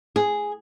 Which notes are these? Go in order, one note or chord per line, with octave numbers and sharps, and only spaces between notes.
G#4